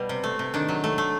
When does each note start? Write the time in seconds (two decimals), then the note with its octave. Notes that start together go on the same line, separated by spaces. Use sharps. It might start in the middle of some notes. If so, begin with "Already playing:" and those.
Already playing: B2 G3
0.09 C3
0.24 A3
0.39 C3
0.54 D#3 D4
0.69 F#3
0.84 A3
0.98 A3